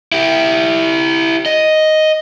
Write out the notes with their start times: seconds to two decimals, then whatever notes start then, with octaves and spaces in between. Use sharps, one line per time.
0.12 E4 G4
1.46 D#5